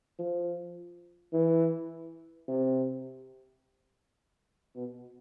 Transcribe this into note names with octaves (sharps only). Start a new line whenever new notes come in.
F3
E3
C3
B2